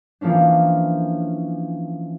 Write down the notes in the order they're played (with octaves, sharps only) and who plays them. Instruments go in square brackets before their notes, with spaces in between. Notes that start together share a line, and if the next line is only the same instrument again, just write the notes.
[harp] E3 F3 A#3 C#4 D4